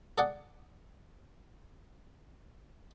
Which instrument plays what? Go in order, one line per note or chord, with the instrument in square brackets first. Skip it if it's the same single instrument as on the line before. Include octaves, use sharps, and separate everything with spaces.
[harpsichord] G#4 A4 D5 F#5